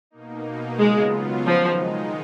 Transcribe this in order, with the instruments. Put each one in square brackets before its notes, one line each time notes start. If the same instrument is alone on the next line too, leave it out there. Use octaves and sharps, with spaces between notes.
[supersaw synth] B2 A#3 D#4
[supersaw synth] C#3 F#3 B3 F4 [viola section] G#3
[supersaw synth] D#3 G#3 D#4 [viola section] F3